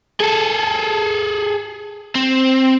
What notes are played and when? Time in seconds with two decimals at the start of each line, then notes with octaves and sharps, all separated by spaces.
0.20 G#4 A4
2.15 C4